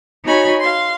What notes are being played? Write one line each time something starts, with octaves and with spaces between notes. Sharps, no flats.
D#4 F#4 C#5 G#5 B5
F5 C6